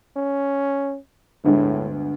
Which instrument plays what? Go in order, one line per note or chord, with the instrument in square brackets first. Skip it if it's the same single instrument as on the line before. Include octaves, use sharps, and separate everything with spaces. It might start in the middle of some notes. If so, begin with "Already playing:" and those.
[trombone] C#4
[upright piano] G1 D2 G#3 [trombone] A2